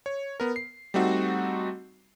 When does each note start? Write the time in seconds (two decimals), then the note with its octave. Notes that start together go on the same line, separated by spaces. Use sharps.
0.06 C#5
0.40 B3 A#4
0.56 C7
0.94 G3 A3 C4 D#4 F#4